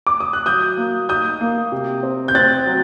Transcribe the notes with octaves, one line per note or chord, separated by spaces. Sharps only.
D6
D#6
F#6
F#3 D#6 G6
A#3
D#4 D#6 G6
A#3
C3
C4
G6
C4 F#6 A6
F#3